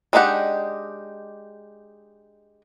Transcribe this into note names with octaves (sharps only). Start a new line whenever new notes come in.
G#3 D4 D#4 G4 F#5